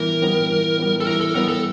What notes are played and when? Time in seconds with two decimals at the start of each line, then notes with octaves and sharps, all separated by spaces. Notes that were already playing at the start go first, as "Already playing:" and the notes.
Already playing: E3 G3 B3 A#4
0.22 G3 B3
0.50 E3
0.78 G3 B3
1.00 A4
1.07 E3 A#4
1.21 A4
1.35 G3 B3 A#4
1.48 A4